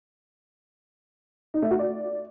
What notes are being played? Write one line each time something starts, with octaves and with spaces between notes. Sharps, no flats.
D#4
A3
F#4
D5